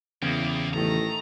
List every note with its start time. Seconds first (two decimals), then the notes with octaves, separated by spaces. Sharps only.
0.22 E2 C#3 A#3 B3 E4 G4
0.74 A1 D#3 A3 A4 A#5